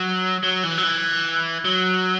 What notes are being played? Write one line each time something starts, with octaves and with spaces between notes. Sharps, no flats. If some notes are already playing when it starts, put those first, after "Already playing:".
Already playing: F#3
F#3
E3
F#3
E3
F#3